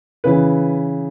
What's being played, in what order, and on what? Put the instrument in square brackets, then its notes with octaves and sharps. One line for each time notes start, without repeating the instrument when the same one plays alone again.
[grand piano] C#3 E3 B4